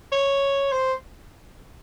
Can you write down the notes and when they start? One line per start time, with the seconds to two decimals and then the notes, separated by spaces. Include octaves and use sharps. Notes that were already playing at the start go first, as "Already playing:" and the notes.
0.12 C#5
0.72 C5